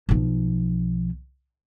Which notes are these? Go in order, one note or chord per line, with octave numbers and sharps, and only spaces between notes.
B1 F3